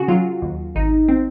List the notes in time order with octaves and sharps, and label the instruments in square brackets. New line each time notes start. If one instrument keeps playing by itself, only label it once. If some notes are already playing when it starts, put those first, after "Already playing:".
Already playing: [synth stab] C#3 F#4 G#4
F#3 F4
D#2
G#1 D#4
C4